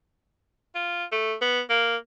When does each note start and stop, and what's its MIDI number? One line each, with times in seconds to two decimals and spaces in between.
0.75 1.04 65
1.12 1.35 57
1.41 1.61 59
1.69 1.96 58